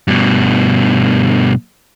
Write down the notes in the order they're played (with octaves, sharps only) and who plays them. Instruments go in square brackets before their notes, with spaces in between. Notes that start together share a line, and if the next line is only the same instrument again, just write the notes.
[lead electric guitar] G2 B2